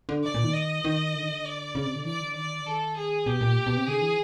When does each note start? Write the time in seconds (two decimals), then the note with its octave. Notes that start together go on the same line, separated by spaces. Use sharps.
0.09 D3
0.24 D5
0.34 A#2
0.44 D#3
0.54 D#5
0.85 D#3
1.15 D3
1.22 D#3
1.30 D3
1.45 D5
1.75 C#3
1.85 C3
1.95 D3
2.05 E3 D5
2.21 D3
2.35 D#3 D5
2.61 D3
2.65 D#3 A4
2.96 G#4
3.26 B2 G4
3.41 A#2
3.67 B2
3.77 C3
3.86 D3 G#4
4.02 E3